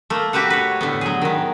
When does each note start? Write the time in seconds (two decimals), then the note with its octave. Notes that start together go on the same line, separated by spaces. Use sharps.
0.10 A3 A#3
0.33 F#4 G4 B4 E5 F#5
0.50 B4 C#5
0.81 A2 D3 B3
1.01 F#3 G#4
1.22 D#3 B3